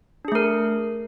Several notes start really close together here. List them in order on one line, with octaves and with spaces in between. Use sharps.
D4 G#4 A3 A#4